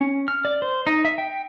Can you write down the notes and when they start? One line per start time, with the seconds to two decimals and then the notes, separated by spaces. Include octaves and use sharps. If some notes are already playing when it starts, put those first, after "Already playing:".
0.01 C#4
0.28 F6
0.45 D5
0.62 C5
0.87 D#4
1.05 E5
1.18 G5